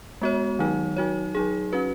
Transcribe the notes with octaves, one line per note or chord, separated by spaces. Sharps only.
G#3 B3 F#4 C#5
D#3 F#3 D#4
F#3 D#4 F#4 C#5
F#3 D#4 G#4
C#4 F#4 B4